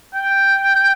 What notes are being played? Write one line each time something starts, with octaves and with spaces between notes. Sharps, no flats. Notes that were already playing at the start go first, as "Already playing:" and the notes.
G5